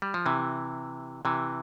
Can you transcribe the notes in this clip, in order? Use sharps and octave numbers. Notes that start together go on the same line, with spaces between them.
G3
F3
C3 E3
C3 E3